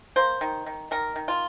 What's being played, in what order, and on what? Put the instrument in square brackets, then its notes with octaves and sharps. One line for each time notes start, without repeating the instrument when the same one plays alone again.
[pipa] A#3 C5
D#3
D#3
D#3 A#4
D#3
F4